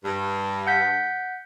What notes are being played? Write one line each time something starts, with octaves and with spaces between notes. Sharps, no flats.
G2
F#5 G6 B6